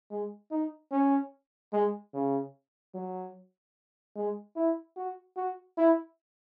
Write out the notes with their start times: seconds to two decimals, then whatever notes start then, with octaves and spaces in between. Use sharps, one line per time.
0.11 G#3
0.51 D#4
0.91 C#4
1.73 G#3
2.14 C#3
2.94 F#3
4.16 G#3
4.56 E4
4.97 F#4
5.37 F#4
5.77 E4